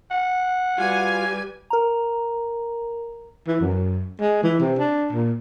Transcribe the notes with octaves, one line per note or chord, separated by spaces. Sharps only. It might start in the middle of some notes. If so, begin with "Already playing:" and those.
F#5
G3 F4 F#4 B4 F5 G#5
A#4 A#5
E3
F#2
G#3
E3
C3
D4
A#2